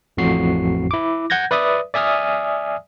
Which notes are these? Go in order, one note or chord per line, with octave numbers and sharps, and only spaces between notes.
A1 F2 A2 F#4 C7
E4 D6
F#5 G6 G#6 A#6
B4 D5 E5 D#6
D5 E5 G#5 D#6 F6